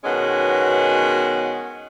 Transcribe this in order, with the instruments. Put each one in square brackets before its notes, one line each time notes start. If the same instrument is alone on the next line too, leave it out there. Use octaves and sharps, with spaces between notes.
[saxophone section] B2 D#3 F#3 G#3 B3 C#4